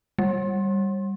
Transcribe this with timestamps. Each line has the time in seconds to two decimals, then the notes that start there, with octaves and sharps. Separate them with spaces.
0.18 G3